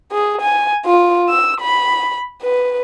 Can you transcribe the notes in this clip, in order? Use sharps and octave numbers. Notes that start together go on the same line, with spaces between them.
G#4
G#5
F4
E6
B5
B4